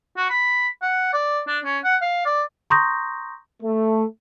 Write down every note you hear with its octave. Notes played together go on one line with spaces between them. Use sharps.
F#4
B5
F#5
D5
D4
C#4
F#5
F5
D5
A#5 C6 C#6 D#6 G6 A#6
A3